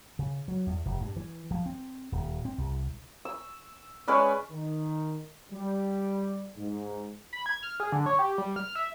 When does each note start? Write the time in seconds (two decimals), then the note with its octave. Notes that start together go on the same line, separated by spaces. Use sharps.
0.19 C#3
0.48 F#3
0.67 E2
0.86 F1
1.01 G2
1.16 E3
1.51 F3
1.66 C4
2.12 D#1
2.45 C4
2.58 C2
3.25 E6
4.08 G#3 C#4 B4 D5
4.51 D#3
5.52 G3
6.57 G#2
7.33 B5
7.46 G#6
7.63 F6
7.80 G#4
7.92 D3
8.06 C#5
8.19 G4
8.38 G3
8.56 F6
8.76 E5